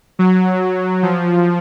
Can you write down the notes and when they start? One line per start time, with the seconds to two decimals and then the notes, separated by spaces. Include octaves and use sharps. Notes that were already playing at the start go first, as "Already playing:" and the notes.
0.19 F#3
1.03 F3